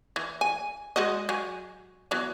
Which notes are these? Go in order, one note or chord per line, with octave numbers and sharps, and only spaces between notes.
E3
G#5
G#3 F#4 D#5
F#3 G#5
E3 F#3 B3